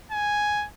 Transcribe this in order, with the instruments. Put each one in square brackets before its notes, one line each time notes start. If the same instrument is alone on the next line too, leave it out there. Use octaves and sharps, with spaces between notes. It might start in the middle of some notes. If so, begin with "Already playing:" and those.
[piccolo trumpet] G#5